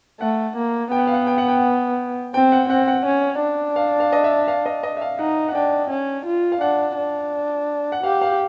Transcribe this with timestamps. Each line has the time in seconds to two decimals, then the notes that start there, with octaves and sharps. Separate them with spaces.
0.20 A3 F#5
0.56 A#3
0.92 B3 G5
0.99 F#5
1.07 F5
1.14 F#5
1.27 G5
1.38 F#5
1.48 G5
2.34 C4 G5
2.52 F#5
2.69 C4 F#5
2.88 F#5
3.06 C#4
3.41 D4
3.76 F5
4.00 F5
4.12 D#5
4.24 E5
4.48 F5
4.66 D#5
4.83 D#5
4.97 E5
5.01 F5
5.19 D#4 F#5
5.48 F#5
5.55 D4 G5
5.90 C#4
6.25 F4
6.52 F5
6.61 D4 F#5
6.97 D4
7.92 F#5
8.03 G4 F5
8.21 F5